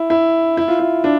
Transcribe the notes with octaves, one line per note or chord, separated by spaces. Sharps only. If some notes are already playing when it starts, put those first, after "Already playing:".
Already playing: E4
E4
E4
F4
E4
D4